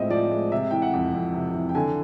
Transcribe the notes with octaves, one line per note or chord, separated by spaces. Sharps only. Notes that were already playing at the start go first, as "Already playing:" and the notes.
Already playing: A2 F3 G#3 C4 D#5 E5
F3 D5
G#3
C3 E5
E3 G5
F#5
F2
F2
C3
E3
G5
D3 G#5